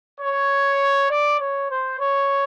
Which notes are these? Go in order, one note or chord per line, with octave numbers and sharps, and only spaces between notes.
C#5
D5
C#5
C5
C#5